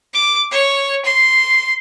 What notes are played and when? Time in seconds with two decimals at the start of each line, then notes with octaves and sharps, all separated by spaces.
0.14 D6
0.51 C#5
1.05 C6